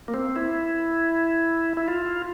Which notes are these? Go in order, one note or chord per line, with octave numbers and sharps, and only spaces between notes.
A#3
C4
E4
E4
F4